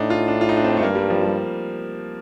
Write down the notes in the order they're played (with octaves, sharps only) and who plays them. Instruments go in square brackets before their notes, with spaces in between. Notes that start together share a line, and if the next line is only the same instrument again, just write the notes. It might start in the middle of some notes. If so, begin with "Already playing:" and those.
Already playing: [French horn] A2 [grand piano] D4 D#4
[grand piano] F4
D4
F4
D#4
D4
C4
A3
[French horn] G2 [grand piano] A#3
[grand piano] G3
F3
G3